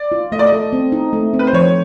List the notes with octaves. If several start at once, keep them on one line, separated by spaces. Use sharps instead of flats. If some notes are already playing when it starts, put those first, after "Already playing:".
Already playing: D5
F4
A3 D#5
D5
D#5
A4
C4
D#4
A3
C4
B4
C5
F3 C#5